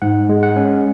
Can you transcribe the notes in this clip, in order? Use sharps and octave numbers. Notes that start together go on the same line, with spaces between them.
G#2 F#5
G#3
F#5
C#4